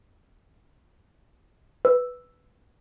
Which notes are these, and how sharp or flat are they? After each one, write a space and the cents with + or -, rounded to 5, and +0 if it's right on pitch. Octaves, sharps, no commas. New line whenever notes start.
B4 +0 E6 +0